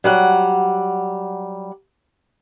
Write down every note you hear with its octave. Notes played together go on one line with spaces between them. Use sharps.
F#3 G3 F#5